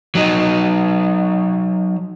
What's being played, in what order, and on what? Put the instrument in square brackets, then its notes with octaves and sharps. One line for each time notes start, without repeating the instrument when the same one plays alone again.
[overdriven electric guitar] F#3 D#4